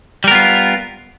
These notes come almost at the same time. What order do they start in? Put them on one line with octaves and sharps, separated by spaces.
G3 A#4 B3 F4